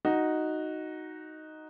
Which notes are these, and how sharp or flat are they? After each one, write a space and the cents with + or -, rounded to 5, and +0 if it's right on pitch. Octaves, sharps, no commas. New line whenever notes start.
D#4 +0 F#4 +0